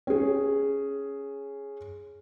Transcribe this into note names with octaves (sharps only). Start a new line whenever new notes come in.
C#4 G#4